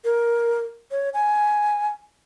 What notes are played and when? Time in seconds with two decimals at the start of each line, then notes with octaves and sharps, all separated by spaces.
0.04 A#4
0.91 C#5
1.14 G#5